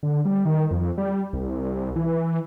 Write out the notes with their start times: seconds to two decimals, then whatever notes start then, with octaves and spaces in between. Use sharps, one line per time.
0.03 D3
0.25 G3
0.45 D#3
0.71 F2
0.98 G3
1.33 C2
1.96 E3